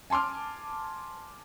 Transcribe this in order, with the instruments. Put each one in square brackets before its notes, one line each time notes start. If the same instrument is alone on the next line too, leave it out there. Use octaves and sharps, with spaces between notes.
[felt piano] G#5 A5 C6 D6 F6